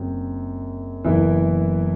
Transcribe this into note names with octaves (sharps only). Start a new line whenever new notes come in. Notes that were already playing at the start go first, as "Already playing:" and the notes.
Already playing: F#1 F#2 F#3 C4
F#1 F#2 E3 B3 E4